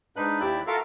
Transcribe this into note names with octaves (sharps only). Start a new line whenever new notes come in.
G#2 D4 D#4 B4 F#6
D#2 E4 G4 D5 E5 F#6
F4 F#4 A4 A#4 E5 F5